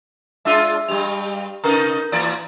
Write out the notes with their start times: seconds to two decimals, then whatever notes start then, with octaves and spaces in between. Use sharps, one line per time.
0.45 G#3 D4 F4 E5 C6 E6
0.88 G2 G3 G4 F7
1.64 C3 D#4 A#4 B4 A#5
2.12 A2 E3 D5 A#5